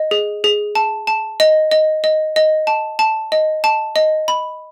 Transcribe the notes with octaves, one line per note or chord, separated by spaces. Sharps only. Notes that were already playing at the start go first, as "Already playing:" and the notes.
Already playing: D#5
G#4
G#4
A5
A5
D#5
D#5
D#5
D#5
A5
A5
D#5
A5
D#5
B5